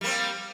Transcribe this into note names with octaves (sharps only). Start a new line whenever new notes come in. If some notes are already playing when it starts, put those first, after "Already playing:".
G3 A#3 C4